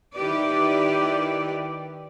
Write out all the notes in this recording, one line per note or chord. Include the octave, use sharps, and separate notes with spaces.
D#3 E4 G4 B4 D5